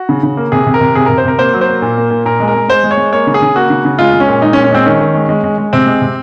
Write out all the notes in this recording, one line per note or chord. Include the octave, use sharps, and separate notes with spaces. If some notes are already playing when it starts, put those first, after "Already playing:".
Already playing: F#4
C#3
C#3
A#3
C3 G#4
C3
A#4
C3
C3 G#4
C3 A#4
C5
C3 A#4
A#3 C5
F#3
C5
A#3
A#2
A#3
A#2
A#2 A#4
G#3
A#4
G#3
G#3 C5
G#3
C#5
G#3
A#3 C#5
C#3
G#4
C#3
A#3 F#4
C#3
C#3
G#3 F4
G#3
C#4
A#2
G#3 D#4
C#4
A#2
C#4
G#3 C4
D#3 C#4
D#3
G#3
G#3
G#3
G#3
C3 C4
G#3
C3